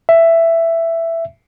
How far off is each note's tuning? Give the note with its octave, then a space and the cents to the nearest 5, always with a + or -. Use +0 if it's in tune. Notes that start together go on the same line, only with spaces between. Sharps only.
E5 +10